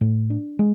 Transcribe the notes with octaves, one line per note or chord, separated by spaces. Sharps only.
A2
D4
G#3